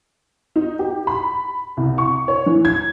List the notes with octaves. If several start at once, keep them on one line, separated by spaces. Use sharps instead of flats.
D#4
G4
B5
C2
C#6
C#5
E3
G#6